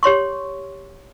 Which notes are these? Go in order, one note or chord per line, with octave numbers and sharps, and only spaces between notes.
G4 C#5 C6 C#6